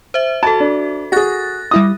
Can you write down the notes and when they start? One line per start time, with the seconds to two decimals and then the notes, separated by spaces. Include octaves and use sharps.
0.14 C5 E5
0.43 F#4 A4 A5
0.60 D4
1.12 F#4 G#4 F#6 A6 A#6
1.71 G3 E4 D#6 A#6